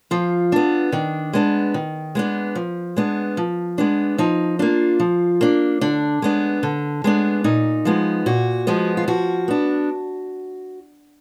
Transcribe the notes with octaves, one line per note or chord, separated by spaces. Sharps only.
F3 F4
B3 D4
D#3 D4
G#3 B3 D4
D#3
G#3 B3 D4
F3
G#3 B3 D4
F3
G#3 B3 D4
F3 D#4
A#3 D4 F4
F3
A#3 D4
D3 D4
G#3 B3 D4
D3
G#3 B3 D4
A#2 D#4
F3 G#3 B3
A#2 F#4
F3 G#3 B3
F4
F3 F#4
B3 D4